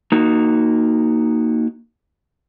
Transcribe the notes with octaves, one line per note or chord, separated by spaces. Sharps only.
A#3 D#4 F#4